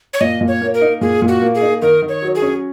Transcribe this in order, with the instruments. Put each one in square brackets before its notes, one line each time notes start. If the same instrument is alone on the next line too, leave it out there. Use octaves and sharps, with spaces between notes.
[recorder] C#5
[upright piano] A#2 [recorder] D#5
[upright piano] A#2
[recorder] C#5
[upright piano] A#3
[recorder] A#4
[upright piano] D#4
[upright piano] A#2 [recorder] G#4
[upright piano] A#2
[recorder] F#4
[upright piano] A#3
[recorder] G#4
[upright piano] D#4
[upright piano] D#3 [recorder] A#4
[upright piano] D#3
[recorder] C#5
[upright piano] F#3
[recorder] G#4
[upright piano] C#4